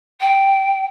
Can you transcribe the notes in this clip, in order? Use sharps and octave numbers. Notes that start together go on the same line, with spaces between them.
G5